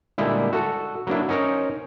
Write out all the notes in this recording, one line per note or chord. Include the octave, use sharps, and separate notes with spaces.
A#2 D3 G3 G#3 E4
F#4 A4
F#3 A#3 D4 E4
C#4 D#4 A#4 C5 C#5